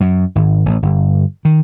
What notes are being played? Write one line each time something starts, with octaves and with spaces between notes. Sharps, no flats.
F#2
G#1
A1
G1
D#3